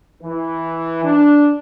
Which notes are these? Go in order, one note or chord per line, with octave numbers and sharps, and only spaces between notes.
E3
D4